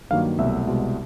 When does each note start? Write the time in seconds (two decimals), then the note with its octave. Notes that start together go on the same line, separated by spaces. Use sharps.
0.11 G2 D#3 F#3 A#3 F5
0.38 C2 B2 F#3 A3 E5
0.67 C2 B2 G#3